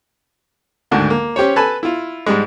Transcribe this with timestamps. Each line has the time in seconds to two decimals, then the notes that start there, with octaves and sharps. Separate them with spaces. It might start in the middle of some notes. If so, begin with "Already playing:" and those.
0.91 D2 G#2 D3 D#3
1.10 A#3
1.36 C#4 G4 C5 C#5
1.56 A4 B4 G#5 A5 B5
1.83 E4 F4
2.27 G#2 G3 G#3